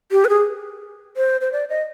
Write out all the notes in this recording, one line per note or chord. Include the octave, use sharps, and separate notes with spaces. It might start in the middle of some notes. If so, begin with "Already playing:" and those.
G4
B4
G#4
C5
C5
D5
D#5